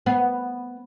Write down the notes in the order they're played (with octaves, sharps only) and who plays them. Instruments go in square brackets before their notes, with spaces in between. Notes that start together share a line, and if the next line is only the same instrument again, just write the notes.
[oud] B3